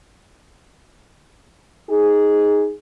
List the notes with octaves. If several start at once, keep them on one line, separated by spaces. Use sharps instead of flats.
D#4 G#4